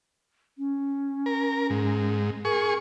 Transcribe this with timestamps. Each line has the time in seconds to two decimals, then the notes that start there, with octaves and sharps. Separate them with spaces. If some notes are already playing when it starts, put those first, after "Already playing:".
0.58 C#4
1.26 A#4
1.70 G#2
2.45 G#4 A#4 C#6